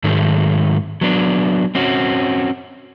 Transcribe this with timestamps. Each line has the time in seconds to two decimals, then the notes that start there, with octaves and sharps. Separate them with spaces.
0.04 G#2 D#3 F#3 G#3 A3
1.01 F#3 B3 D4
1.75 C4 C#4 F#4